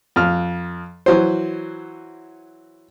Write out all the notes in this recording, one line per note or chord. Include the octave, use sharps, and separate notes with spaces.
F2 F6
E3 F#3 C5